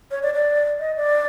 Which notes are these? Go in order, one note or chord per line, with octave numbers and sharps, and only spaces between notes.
C#5
D5
D5
D#5
D5